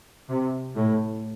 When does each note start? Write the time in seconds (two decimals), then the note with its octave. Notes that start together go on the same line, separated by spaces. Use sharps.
0.28 C3
0.75 A2